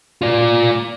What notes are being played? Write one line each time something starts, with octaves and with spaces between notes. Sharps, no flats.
F4 D5